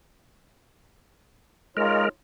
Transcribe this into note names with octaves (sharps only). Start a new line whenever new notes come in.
G#3 D#4 F4 A#4 C#5